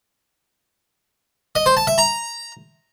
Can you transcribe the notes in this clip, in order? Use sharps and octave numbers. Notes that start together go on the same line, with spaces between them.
D#5
C5
A5
E5
A#5